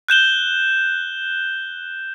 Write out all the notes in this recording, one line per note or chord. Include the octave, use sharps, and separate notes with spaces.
F#6 G6 E7 G7